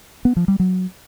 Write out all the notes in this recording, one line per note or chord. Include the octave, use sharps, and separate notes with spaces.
B3
F3
G3
F#3